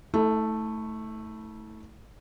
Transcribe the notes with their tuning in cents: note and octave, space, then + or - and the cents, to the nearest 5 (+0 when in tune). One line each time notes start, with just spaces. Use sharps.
A3 +0 E4 -45